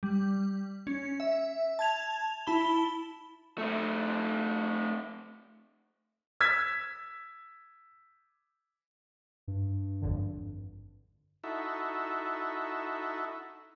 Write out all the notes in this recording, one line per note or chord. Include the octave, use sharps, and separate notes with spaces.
G3
C#4
E5
A5 G#6 F7
E4 A5 B5 G7
A3 C4
E6 G#6 B6
G2
G#1 F2 D3
D#4 E4 F#4 A4 E5